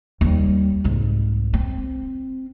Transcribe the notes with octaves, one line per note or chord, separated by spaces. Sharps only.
D#2 G3
C2 G#2
C4